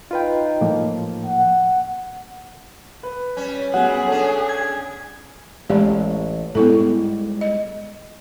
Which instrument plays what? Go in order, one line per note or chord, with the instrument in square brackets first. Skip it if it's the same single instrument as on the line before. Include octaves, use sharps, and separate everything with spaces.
[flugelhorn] D#4 [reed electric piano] F4 B4 G5
[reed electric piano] A2 F3 A#3
[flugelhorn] F#5
[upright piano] B4
[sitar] G3 C#4
[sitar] A#2 G3 [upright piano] F#3 B3 [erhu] G#4 [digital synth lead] F#5
[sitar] C#3 D4 [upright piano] A4 C#5 G#5
[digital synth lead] G#6
[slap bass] A1 [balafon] G#3 G4 D5
[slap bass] G#2 G3 [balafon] B3 E4 A4
[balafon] D#5